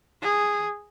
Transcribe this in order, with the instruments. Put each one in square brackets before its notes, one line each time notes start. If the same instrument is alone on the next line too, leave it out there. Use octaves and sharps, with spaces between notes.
[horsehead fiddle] G#4